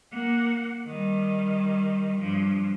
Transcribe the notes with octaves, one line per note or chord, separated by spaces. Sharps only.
A#3 F#5
D#3 G3
G2 F3